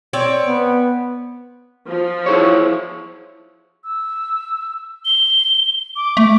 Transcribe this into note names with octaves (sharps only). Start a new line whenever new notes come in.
C4 C#5 D5
B3
F3
E4 G#4 C#5
E6
G7
D6
A3